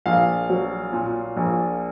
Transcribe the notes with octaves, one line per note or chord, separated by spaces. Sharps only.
A#1 F5
F#3
A#2
A#1